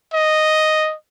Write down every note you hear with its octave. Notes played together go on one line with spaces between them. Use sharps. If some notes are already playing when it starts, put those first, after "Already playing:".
D#5